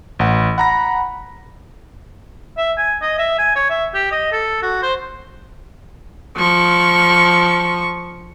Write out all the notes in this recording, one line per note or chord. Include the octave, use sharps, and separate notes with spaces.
A1 F#5
F#5 A#5 B5 A#6
E5
G#5
D#5
E5
G#5
C#5
E5
G4
D#5
A4
F#4
C5
F3 C#6